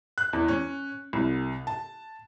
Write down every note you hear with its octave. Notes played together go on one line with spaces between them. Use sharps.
F#6
E2
C#4
C2
A5